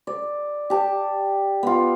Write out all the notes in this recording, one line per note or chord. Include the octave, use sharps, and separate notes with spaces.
D5
G4 A5
B3 F4